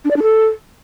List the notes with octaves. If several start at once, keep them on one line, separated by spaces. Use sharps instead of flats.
D4
D5
D4
A4